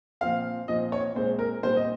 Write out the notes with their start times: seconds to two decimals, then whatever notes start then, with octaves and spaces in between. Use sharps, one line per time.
0.21 A#2 F3 C4 F5
0.68 A#2 F3 C4 D#5
0.92 C#5
1.15 A#2 G#3 C4 C5
1.39 A#4
1.63 A#2 G3 C4 C5
1.77 D#5